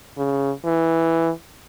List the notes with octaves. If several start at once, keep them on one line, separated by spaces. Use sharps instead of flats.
C#3
E3